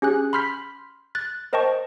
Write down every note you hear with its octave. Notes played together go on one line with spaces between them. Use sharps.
C#4 G4 G#4 G#5 F#6
B5 C6 F6 G6 B6
F#6 A6
A#4 C5 D#5 G5 A5 C#6